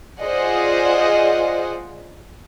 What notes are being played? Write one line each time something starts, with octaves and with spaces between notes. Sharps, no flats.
F4 G#4 C5 D5 D#5 F#5